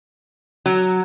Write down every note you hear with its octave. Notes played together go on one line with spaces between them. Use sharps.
F#3